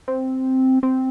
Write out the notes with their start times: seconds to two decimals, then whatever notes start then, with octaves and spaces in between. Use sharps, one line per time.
0.08 C4
0.83 C4